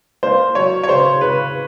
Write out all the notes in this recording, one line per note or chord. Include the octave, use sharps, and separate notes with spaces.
A#3 C5
F#3 C#5
C#5
C#3 C5
C#3 B4